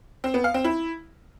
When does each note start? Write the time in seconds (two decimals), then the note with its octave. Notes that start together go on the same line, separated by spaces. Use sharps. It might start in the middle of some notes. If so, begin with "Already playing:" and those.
0.24 C4
0.34 B3
0.44 F5
0.54 C4
0.64 E4